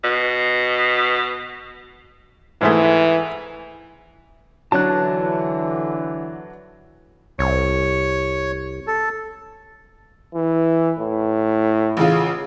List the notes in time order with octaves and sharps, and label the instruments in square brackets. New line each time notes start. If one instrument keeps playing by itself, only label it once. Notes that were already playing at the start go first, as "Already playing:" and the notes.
[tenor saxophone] B2
[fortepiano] G#2 G#3 A3 [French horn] E3
[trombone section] D3 E3 [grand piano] F#3 D4 F#4 [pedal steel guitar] A5 F#6
[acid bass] C2 [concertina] C#5
[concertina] A4
[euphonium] E3
A2
[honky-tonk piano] A1 C#3 F4